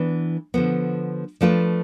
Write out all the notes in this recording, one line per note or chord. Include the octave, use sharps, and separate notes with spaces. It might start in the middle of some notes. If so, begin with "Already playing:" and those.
Already playing: E3 B3 D4
D3 F3 B3
F3 A3 D4 F4 B4